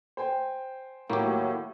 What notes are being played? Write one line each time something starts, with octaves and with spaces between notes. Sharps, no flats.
C5 G5 G#5
D#2 A2 F#3 A#3 G4